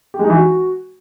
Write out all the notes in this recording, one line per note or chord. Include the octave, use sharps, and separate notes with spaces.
G4
G#3
D#4
E3
F#4